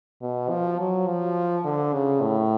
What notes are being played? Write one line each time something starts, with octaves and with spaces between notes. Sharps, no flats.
B2
F3
F#3
F3
D3
C#3
A2